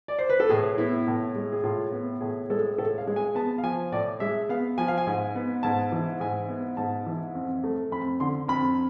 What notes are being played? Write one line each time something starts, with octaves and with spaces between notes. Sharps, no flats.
D5
C5
B4
A4
A2 G#4
B3 E4
A2
G#3
G#4
A2 F4
B3
A2 G#4
G#3 A4
A2 A4
F5
G#3
G#5
B3 A5
F5
F3 G#5
A2 D5
G#3 E5
B3 F5
F3 G#5
F5
G#5
G#2
B3
G#2 A5
E3
G#2 G#5
B3
G#2 A5
E3
F2
A3
F2 B5
D3 C6
F2 B5